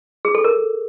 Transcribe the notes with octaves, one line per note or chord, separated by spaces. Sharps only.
G#4
A4
A#4